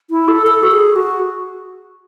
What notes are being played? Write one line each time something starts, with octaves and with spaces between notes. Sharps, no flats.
E4
A4
A4
F#4
G#4
F#4